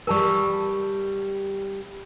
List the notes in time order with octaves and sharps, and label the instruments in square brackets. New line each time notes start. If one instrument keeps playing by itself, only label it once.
[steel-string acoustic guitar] G3 G4 [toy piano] A#4 A5 C#6